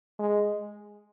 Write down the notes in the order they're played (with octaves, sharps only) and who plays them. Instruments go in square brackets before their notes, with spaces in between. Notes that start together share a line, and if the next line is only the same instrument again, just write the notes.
[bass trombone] G#3